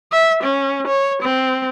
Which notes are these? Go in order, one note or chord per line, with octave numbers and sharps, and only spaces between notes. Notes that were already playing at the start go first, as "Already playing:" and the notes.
E5
C#4
C#5
C4